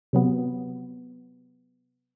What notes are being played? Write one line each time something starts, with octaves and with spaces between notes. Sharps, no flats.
C3 F#3 B3